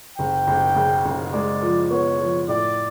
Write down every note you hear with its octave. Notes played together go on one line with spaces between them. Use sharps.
F#1 G5
F#1
C#3
F#1
G#3 D5
F3
B3 C#5
F3
A2 D5